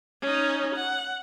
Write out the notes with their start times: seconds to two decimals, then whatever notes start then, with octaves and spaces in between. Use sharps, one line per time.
0.22 C#4 D#4
0.75 F#5